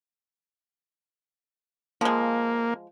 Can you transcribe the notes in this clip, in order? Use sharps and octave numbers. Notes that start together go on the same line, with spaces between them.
F3 G#3 A#3